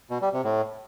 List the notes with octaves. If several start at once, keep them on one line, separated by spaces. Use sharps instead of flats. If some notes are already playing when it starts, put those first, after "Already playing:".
B2
G3
C3
A2